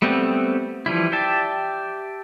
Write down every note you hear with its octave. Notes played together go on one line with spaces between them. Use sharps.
G3 A3 B3 C4
E3 F3 G3 E4
G4 D5 E5 G5 A5